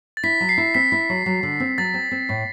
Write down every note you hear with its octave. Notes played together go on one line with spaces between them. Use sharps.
A6
E4 B6
F#3
C7
E4
C4 B6
E4
F#3
F#3
D3
C4
F#3 A6
C4
C4
A2